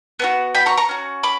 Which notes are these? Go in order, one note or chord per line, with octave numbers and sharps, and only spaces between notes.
B3 D4 F#4
G5 B5
A#5 C#6
A#5 C#6
C#4 F#4
B5 D6